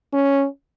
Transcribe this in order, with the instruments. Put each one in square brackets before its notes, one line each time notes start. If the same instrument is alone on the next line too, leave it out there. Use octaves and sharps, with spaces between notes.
[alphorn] C#4